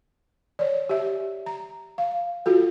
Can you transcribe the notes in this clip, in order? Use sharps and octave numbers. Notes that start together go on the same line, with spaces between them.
C#5 D5
G4 E5
A#5
F5
F4 F#4 A4